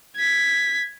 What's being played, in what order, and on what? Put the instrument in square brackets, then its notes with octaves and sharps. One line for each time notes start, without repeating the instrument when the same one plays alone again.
[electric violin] G#6 B6